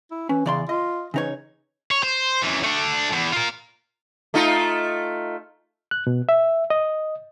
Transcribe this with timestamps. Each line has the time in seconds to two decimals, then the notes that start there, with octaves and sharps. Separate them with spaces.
0.11 E4
0.29 E3 C#4
0.46 E2 C#3 D5 C6
0.69 F4 D#5
1.14 C#3 E3 D#4 C#5
1.91 C#5
2.03 C5
2.42 F#2 E3
2.64 A3 D4
3.13 E2
3.33 F4 A#4
4.34 A3 D#4 F4
5.91 F#6
6.07 B2
6.29 E5
6.70 D#5